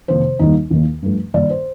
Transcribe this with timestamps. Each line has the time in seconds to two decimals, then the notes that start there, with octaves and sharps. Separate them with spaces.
0.08 F2 C3 D#3 A#3 C5
0.39 D#2 D#3 G3 A#3 D#4
0.70 D#2 D#3 A#3
1.02 G2 F3 A3
1.34 G2 D#3 A#3 D5
1.50 C5